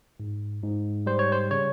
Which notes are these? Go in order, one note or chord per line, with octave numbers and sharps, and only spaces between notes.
G#2
G#2
G3 C5
C#5
C5
C#3 C#5